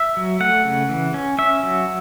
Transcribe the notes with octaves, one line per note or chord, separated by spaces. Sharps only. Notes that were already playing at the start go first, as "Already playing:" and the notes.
Already playing: E5
F#3
A3 F#5
C#3
E3
C#4
C#4 E5
F#3